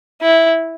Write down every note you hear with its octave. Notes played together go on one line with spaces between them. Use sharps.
E4